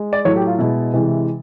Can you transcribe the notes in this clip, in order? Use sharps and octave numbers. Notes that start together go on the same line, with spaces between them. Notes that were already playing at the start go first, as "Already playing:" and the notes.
Already playing: G#3
D5
A2 F#3 A3 C#5
G4
F4
B2 G#3 E4
C3 E3 G#3